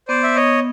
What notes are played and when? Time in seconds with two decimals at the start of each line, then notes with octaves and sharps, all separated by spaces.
0.08 B3 C5 D5
0.23 E5
0.36 B3 C#5 D#5